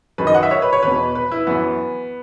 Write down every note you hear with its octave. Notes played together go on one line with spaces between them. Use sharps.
F#2 D#3 B4
D#5
F#5
E5
C#5
B4
C#5
E2 B2 B4
B4
E4
F#2 E3 B3